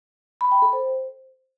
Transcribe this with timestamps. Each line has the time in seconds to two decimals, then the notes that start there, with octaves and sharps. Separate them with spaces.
0.41 B5
0.51 G5
0.62 A4
0.73 C5